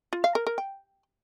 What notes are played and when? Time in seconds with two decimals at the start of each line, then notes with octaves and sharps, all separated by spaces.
0.13 F4
0.24 F5
0.35 A#4
0.47 A#4
0.58 G5